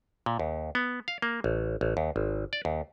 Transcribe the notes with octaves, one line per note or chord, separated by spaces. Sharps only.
A#2
D#2
B3
F5
A#3
A1
A1
D#2
G#1
D5
D#2